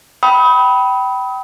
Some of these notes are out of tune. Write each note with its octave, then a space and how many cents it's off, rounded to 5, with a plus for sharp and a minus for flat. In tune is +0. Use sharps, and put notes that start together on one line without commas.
G5 -25 B5 +0 D#6 +35